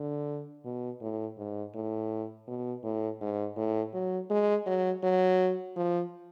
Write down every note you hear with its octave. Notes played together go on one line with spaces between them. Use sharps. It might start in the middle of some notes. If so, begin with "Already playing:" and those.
Already playing: D3
B2
A2
G#2
A2
B2
A2
G#2
A2
F#3
G#3
F#3
F#3
F3